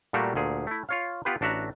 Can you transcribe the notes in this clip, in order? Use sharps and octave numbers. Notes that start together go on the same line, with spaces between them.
A#2 G3 A3 A#3 F#4 G4
D2 A#2 G#4
A3 E4
F4 C#5 F5
B3 F4 G4 B4
A1 D4 F#4 E5 F#5 A#5